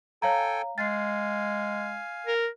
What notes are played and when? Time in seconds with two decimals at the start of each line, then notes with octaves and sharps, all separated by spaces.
0.22 A4 C#5 F5 G5 G#5 A#5
0.78 G#3 F5 G#5 A6 C7
2.27 A#4